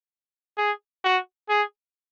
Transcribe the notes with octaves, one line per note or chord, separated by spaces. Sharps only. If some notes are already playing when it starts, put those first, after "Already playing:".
G#4
F#4
G#4